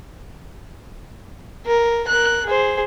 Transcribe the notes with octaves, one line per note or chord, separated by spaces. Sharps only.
A#4
A#4 F#6
G#4 C5